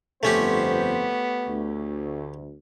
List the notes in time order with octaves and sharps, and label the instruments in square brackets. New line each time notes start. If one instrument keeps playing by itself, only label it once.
[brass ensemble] G1 F2 C5 [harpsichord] A3 C#4 G4 [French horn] B3
[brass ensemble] D2